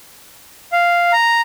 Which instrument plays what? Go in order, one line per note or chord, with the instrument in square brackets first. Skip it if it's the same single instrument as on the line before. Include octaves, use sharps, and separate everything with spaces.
[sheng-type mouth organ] F5
A#5